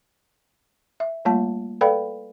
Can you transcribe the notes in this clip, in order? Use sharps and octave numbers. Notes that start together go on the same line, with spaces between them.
E5
G3 A3 A#3 F4 A5
A4 B4 D5 F5 G5 B5